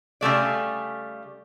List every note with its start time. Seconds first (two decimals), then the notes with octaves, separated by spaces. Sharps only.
0.21 C#3 G3 A3 D5